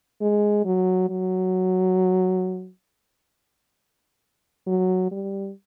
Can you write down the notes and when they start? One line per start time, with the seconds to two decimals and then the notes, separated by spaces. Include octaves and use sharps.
0.21 G#3
0.65 F#3
1.09 F#3
4.67 F#3
5.11 G3